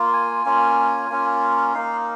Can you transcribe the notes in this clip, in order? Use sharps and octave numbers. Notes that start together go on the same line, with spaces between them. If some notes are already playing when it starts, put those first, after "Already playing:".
Already playing: A#3 F4
G#5
A#3 C#4 F4
A#3 C#4 F4
A#3 D#4 F5